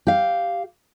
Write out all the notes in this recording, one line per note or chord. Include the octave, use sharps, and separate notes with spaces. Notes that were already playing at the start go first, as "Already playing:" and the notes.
G4 F5